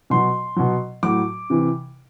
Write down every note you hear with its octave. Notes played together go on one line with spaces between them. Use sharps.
B2 F#3 C6
B2 F#3
A2 F#3 D6
C3 E3